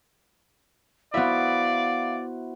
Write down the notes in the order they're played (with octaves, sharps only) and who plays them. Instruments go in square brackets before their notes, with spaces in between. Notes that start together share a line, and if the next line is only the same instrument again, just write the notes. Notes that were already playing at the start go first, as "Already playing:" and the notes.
[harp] B3 E5 [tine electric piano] E4 F#4 C5 [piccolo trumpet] D5 [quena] F5